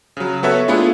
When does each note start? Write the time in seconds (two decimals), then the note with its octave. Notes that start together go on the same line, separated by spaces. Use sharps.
0.17 C#3 F#3
0.43 B3 F#4 A4 B4 C#5 E5
0.68 A3 B3 D4 E4 F4 G#4